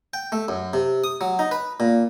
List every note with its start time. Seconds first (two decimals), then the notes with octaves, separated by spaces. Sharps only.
0.14 G5
0.32 A3
0.48 F#2
0.73 C3
1.04 D#6
1.21 F#3
1.39 D#4
1.51 B4
1.80 A#2